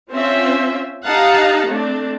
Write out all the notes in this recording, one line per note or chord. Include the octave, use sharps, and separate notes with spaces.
C4 C#4 F4 C5 E5
D#4 G4 F5 F#5 A5 A#5
A3 C4 D4